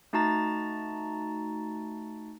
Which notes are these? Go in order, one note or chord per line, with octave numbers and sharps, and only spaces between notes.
A3 D#4 F#4 A5 A#5 A6